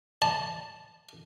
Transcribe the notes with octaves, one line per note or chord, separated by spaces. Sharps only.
A5